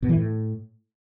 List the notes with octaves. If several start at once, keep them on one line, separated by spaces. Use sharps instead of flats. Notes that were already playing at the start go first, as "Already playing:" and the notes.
B2
E3
A2